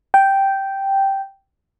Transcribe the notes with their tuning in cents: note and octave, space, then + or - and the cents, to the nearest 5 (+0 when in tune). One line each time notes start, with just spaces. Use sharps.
G5 -5